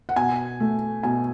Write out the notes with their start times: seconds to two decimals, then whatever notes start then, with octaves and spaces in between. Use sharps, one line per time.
0.09 F#5
0.16 B2 G#5
0.60 A3
1.03 B2 G#5